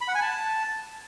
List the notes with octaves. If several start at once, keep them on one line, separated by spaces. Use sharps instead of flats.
B5
F#5
G#5
A5